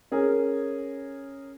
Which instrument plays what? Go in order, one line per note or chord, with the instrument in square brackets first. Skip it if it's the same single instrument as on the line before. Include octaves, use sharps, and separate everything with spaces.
[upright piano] C#4 G#4 A#4